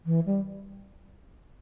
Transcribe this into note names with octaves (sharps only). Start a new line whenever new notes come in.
E3
G3